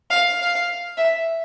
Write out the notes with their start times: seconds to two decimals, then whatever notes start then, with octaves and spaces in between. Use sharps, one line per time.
0.10 F5
0.40 F5
0.97 E5